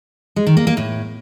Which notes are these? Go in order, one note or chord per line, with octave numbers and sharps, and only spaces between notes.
G#3
D#3
A#3
A#3
A2